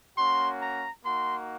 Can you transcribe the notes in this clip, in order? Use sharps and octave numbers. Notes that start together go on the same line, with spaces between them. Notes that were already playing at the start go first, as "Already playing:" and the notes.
A#3 C#4 F#4 C6
A#5
A#3 D#4 F#4 C6